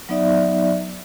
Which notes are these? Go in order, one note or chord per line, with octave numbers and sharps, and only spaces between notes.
F#3 B3 D#4 D5 E5